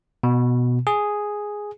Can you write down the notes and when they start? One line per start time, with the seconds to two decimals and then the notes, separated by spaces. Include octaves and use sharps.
0.23 B2
0.87 G#4